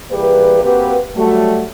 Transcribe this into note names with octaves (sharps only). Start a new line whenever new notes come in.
E3 G3 A#3 G4 G#4 B4
A#3 C4 F#4 G4 B4
F#3 G3 A3 F#4